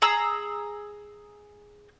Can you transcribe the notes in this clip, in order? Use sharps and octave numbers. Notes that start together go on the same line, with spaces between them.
G#4 A#5 E6